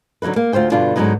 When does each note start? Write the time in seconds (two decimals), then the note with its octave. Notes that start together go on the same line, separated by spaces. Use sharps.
0.22 D3 F#3 G#3 D#4 B4
0.36 A#3
0.53 D2 F4 C5 G5
0.72 G2 B2 D3 D4 F4
0.96 G#2 D3 D#3 F#3 B3 D#4